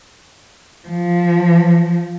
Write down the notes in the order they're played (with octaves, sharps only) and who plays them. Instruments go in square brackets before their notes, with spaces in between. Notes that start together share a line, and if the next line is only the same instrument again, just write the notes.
[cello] F3